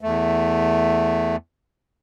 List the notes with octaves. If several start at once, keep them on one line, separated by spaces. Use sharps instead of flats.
E2 A3